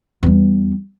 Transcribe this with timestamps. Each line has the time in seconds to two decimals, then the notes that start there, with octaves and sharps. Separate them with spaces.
0.23 E2 G3